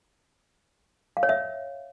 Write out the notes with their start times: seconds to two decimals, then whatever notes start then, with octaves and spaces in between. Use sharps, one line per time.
1.17 F5
1.23 C#5
1.29 E5